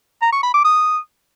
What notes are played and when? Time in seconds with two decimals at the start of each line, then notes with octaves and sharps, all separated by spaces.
0.22 A#5
0.32 C#6
0.43 B5
0.54 D6
0.64 D#6